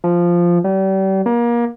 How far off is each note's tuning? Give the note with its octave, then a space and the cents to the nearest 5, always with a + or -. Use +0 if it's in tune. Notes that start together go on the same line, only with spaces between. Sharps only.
F3 -5
G3 -35
A#3 +30